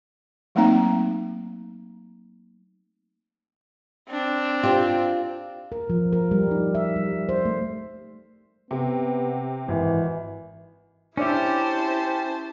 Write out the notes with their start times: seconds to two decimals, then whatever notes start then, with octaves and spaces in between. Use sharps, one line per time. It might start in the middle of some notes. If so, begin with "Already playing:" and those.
0.55 F#3 A3 A#3 C4 D#4 A#5
4.09 C4 D4
4.63 F4 G4 C5
5.72 A#4
5.90 F3
6.13 A#4
6.31 G3
6.51 D#4
6.75 E5
6.96 G3
7.29 C5
7.45 A3
8.71 C3 B3
9.68 G#1 E3
11.17 C#4 D4 E4 G4 C5 D5 E5 A5